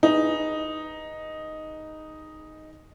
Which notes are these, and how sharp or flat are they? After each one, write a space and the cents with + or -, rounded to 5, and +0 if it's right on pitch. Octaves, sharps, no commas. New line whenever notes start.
D#4 +0 G#4 +0 B4 +0